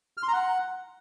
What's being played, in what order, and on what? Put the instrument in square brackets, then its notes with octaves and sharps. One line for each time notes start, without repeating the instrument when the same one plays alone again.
[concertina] F6
C6
A#5
F#5